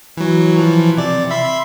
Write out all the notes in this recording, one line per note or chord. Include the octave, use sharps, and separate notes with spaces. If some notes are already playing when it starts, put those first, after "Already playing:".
E3 F#3
E3 F3
C3 D5
E5 B5 C6